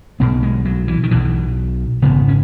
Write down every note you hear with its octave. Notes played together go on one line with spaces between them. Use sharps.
B1 B2 B3
G#3
F#3
E3
D#3
B1 B2 E3
G#1 F#2 C#3 B3
C#4